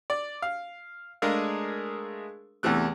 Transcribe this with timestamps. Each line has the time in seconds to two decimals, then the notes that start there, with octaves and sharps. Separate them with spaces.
0.10 D5
0.42 F5
1.22 G#3 A3 D4 G#4 A#4 F5
2.63 E2 C3 E3 A3 F#6